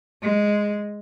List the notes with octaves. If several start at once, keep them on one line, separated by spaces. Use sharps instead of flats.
G#3